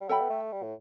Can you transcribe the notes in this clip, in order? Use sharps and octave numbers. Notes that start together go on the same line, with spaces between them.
G3
F#3 A4 E5 G5 B5
B3
A3
G3
A2